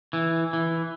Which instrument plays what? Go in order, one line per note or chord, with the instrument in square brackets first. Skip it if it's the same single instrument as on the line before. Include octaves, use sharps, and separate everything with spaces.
[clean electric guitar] E3
E3